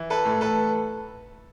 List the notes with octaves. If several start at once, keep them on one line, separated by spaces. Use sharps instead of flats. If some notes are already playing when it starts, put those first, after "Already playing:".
Already playing: E3
A4 B4
A2
A4 B4